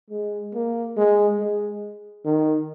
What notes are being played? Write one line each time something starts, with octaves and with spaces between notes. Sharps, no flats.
G#3
A#3
G#3
G#3
D#3